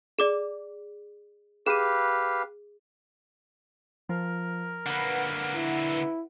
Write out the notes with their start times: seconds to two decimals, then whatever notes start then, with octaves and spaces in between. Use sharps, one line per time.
0.19 G#4 D5 D6 E7
1.66 G4 G#4 B4 F5 D#7 E7
4.09 F3 A#4
4.86 D3 A#3 B4 F#5
5.55 E4